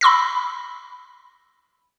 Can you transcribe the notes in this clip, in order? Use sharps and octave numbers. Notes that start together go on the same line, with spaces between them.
B5 C6 E6 A#6